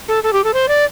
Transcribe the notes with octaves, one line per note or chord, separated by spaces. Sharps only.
A4
A4
G4
A4
C5
D5